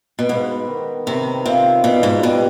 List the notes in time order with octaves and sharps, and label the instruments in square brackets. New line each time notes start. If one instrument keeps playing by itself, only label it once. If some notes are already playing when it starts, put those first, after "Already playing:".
[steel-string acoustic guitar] B2
[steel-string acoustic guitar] G#2 [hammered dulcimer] B3
[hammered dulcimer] D#3
[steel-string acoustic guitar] C3 [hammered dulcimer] D#3
[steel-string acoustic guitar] C3 [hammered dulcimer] F4
[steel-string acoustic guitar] B2 [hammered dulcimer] D4
[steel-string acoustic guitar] G#2
[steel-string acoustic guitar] B2 [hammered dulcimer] G3